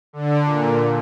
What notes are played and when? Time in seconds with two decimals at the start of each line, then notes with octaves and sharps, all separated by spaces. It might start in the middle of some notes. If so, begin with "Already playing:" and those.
0.13 D3
0.45 A#2